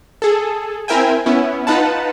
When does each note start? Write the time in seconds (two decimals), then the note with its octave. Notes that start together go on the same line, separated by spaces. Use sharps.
0.22 G#4 A4
0.88 C4 E4 A#4 E5 G5 G#5
1.26 B3 C#4 E4
1.67 D#4 F4 B4 F#5 A5